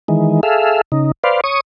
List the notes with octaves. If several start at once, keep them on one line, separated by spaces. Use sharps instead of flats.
D#3 E3 G#3
G#4 A4 E5 F5
C#3 D#4
B4 C5 D5 F5
C#5 C#6 D#6